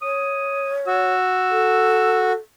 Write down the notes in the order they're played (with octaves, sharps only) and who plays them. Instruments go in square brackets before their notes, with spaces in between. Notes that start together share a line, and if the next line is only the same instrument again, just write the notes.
[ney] C#5 [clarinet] D#6
[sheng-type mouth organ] F#4 [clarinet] E6
[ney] A4